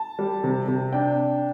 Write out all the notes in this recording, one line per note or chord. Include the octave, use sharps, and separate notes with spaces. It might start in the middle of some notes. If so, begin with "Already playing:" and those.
Already playing: A5
G3
C3
C3
D4 G5